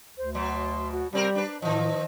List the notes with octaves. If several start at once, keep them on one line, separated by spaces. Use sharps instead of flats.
D2 C5
B2 F#3 C6
F#4
C3 G3 C4 G4 A#4
D4 B4
A2 D#3 F3 D#5